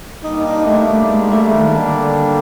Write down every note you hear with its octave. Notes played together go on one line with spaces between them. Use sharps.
G3 A#3 D4 D#4 G4
D#4
A3
A3
G#3
A3
D#3
D3